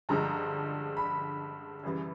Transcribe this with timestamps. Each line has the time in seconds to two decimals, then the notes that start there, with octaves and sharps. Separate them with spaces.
0.09 G2 D3 F3 G#3 A#5
0.97 B5
1.83 F#2 C#3 E3 G3